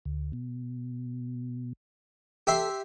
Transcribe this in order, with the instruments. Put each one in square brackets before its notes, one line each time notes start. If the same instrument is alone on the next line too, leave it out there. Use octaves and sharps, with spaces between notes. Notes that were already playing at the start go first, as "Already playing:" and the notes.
[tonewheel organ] D2
B2
[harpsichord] G4 E5 C6 [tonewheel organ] A4